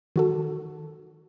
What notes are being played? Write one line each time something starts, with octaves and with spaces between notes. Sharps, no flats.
D#3 F#4 A4